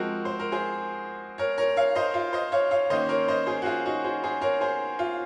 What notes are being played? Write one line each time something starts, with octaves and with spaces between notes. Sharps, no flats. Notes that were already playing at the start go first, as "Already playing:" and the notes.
Already playing: F3 G#3 C4 F#4 A#4
C5
A#4
G#4 C5
A#4 C#5
A#4 C#5
C#5 F5
C5 D#5
F4
C5 D#5
C#5 F5
C#5 F5
D#3 A#3 C#4 C5 D#5
A#4 C#5
C5 D#5
G#4 C5
F#4
F4 G#4
D#4 F#4
G#4 C5
G#4 C5
A#4 C#5
G#4 C5
F4